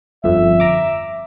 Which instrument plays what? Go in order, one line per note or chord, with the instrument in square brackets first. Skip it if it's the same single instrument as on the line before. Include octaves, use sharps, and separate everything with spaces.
[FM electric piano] G1 F2 [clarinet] E5
[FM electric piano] A#5 D6